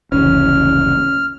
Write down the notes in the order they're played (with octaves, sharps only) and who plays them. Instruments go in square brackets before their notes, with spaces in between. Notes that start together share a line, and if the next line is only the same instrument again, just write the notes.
[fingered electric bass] F1 C#2 E3 [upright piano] C#4 [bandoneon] F6